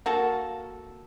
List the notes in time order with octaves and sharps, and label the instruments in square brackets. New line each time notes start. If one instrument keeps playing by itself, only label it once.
[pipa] A#3 F#4 A4